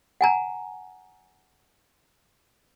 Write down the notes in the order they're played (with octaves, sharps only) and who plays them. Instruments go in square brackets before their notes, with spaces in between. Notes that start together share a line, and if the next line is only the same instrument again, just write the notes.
[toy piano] F#5 G#5 A#5